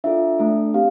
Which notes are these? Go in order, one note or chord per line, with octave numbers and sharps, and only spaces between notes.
D4 F4 A4 E5
A3 D4 A4
C4 G4 F5